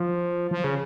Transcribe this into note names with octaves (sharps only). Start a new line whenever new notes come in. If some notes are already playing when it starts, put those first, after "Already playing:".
Already playing: F3
F3
C#3